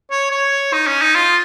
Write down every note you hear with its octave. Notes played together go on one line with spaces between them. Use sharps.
C#5
C#5
D#4
C#4
D#4
F4